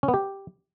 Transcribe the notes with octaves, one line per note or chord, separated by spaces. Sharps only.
C#4
B3
G4